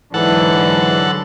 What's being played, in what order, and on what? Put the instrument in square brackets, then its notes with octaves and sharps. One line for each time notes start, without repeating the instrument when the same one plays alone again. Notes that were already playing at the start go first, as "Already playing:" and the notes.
[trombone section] G#2 E3 [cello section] D3 F#3 [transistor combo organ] A4 F#5